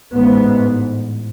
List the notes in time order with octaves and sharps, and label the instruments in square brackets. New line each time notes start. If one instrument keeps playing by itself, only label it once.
[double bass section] A1 G#2 B3